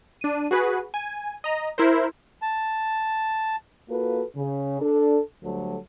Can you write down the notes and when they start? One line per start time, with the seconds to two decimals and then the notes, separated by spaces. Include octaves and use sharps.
0.21 D4 D#7
0.51 F#4 G#4 B4
0.94 G#5
1.44 D#5 A#5
1.78 E4 A#4 C5
2.42 A5
3.89 A#3 F4 F#4 A4 B4
4.35 C#3
4.81 D4 A4
5.43 D2 F#3 G3 A4